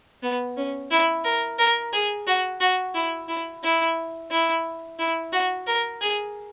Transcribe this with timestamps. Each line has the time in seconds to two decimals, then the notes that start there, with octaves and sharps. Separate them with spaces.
0.23 B3
0.57 C#4
0.91 E4
1.24 A#4
1.58 A#4
1.93 G#4
2.27 F#4
2.60 F#4
2.94 E4
3.28 E4
3.63 E4
4.31 E4
4.99 E4
5.32 F#4
5.67 A#4
6.01 G#4